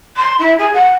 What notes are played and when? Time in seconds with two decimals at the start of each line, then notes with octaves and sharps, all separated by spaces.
0.16 C6
0.39 E4
0.58 G#4
0.73 F#5